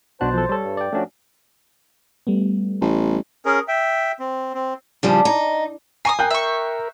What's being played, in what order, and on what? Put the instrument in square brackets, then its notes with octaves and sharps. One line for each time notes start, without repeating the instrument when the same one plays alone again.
[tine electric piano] B1 B2 F#6 [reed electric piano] D4 F#4 [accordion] C5 A5
[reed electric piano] F3 A4
[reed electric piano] G3 A4 [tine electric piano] C#5
[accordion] G2
[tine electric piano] D5 G5
[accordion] F3 C#4 [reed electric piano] A3 D4 F#4
[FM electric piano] G3 A3 B3
[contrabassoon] A1
[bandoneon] C#4 G#4 A#4
E5 G5
C4
C4
[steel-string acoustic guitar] C#3 F3 G3 [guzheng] D4
[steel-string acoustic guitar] D#4
[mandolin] G#5 C#6 D#6 [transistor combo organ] A#5 [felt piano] C7
[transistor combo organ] A#4 [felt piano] G5 F#6 G6
[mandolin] E5 C#6